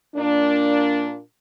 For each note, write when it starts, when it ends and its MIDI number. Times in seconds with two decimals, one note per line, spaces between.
0.15 1.19 46
0.15 1.19 58
0.15 1.19 62